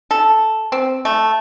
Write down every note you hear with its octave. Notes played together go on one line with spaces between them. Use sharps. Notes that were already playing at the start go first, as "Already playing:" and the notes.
A4
C4
A3